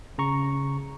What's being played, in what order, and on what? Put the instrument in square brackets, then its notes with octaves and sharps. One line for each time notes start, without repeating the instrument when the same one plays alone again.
[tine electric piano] C#3 A#5 C#6